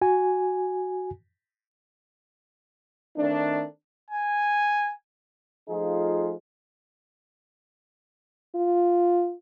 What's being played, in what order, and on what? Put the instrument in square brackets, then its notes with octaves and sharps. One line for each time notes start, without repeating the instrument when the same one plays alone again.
[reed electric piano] F#4 G#5
[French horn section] D#3 A3 C4 D4
[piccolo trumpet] G#5
[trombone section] F3 A3 D#4 F4 G#4
[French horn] F4